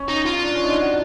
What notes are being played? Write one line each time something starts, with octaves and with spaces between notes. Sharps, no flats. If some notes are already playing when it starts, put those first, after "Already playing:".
Already playing: C#4
D#4
F4
D4
C#4
D#4
D4
F#4